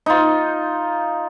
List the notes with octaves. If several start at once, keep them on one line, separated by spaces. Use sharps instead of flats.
D#4 F4